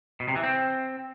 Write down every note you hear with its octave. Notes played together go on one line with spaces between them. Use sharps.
B2
C3
E3
C4